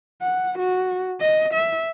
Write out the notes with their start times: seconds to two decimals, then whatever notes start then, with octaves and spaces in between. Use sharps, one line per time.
0.22 F#5
0.59 F#4
1.21 D#5
1.54 E5